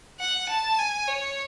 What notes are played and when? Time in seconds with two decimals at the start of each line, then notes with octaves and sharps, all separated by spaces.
0.20 F#5
0.49 A5
0.79 G#5
1.08 C#5